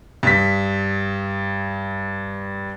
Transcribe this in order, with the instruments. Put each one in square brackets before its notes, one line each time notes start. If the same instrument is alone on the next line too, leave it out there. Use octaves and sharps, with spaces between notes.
[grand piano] G2 B6